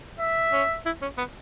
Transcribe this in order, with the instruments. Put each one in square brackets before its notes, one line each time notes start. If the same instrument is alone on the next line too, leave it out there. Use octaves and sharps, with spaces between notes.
[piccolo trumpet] E5
[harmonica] C#4
E4
C#4
B3